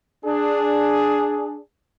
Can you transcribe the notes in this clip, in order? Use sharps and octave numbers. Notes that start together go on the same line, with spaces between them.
D4 G#4